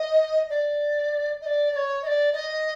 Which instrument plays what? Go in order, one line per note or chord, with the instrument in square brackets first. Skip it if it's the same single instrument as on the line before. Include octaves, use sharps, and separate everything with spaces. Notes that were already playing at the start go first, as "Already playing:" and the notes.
Already playing: [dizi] D#5
D5
D#5
D5
D5
C#5
D#5
D5
D#5